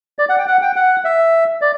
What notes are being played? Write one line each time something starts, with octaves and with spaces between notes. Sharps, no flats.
D5
F#5
G5
F#5
G5
F#5
E5
D5